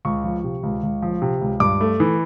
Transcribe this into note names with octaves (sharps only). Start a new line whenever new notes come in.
C#2 C#6
F3
C3
C#2
C#2
F3
C3
C#2
G2 D6
A3
E3